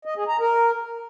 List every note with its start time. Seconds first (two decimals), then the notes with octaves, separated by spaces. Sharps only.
0.05 D#5
0.17 G#4
0.28 A#5
0.40 A#4